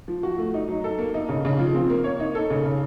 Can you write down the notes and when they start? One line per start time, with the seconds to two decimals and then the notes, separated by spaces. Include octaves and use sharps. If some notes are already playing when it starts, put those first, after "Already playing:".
0.08 F3
0.23 F#4
0.38 A3
0.54 D#4
0.68 F#3
0.84 A4
0.99 A#3
1.14 D#4
1.29 C#3
1.45 C#3
1.59 F3
1.75 C4
1.90 A#3
2.04 C#5
2.20 D#4
2.35 A4
2.50 C#3
2.65 C#3